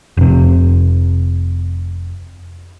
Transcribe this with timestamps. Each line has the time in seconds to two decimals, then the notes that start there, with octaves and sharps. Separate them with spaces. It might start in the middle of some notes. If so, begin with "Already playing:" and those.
0.17 F1 C3